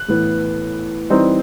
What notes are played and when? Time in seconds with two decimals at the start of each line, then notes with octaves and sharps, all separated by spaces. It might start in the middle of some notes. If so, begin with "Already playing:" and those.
Already playing: F#6
0.08 A2 E3 B3
1.10 E3 G3 C4 D#4